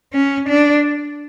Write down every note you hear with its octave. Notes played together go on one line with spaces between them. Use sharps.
C#4
D4